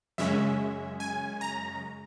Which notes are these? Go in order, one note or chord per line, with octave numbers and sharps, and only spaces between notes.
F#2 C#3 G#3 C#4 E5
G#5
A#5